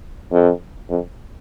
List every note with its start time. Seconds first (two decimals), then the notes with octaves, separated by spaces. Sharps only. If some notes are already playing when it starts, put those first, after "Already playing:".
0.32 F2
0.90 F2